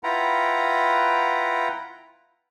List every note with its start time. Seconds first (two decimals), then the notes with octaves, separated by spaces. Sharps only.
0.03 E4 F4 B4 F#5 G5 A#5